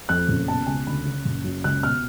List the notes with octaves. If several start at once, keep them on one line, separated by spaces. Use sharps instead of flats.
F2 F#6
F#1
B2 A5
C#2 G#5
D2 B5
C#3
F#1
F#2
C#2 F#6
B2 F6